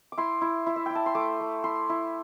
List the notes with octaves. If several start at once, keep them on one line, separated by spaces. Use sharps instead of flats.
D6
E4 C6
E4
E4
E5
E4 G5
A5
C6
A3 D6
A3
E4 C6
E4